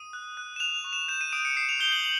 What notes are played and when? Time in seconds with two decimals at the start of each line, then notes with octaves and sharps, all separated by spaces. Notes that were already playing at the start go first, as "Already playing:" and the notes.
Already playing: D#6 D#7
0.13 F#6
0.37 F#6
0.56 E7
0.60 F#6 F7
0.84 C#6
0.93 E7
1.08 G6 E7
1.21 D#7
1.33 D#6 D7
1.45 C#7
1.56 D#6 C7
1.69 F7
1.80 G6 G7
1.92 F#7
2.04 F#7